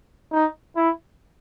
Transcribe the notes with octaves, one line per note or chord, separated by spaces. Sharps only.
D#4
E4